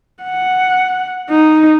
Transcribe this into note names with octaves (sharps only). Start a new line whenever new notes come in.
F#5
D#4